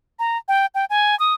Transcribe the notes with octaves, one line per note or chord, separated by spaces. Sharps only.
A#5
G5
G5
G#5
D#6